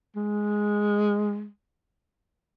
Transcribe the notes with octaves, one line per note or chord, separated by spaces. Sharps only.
G#3